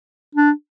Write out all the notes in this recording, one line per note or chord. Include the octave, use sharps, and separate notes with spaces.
D4